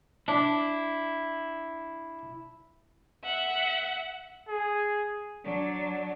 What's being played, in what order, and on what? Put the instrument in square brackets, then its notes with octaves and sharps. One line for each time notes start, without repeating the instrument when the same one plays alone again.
[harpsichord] D4 [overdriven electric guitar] E4
[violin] E5 F#5
[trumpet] G#4
[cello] F#3 D4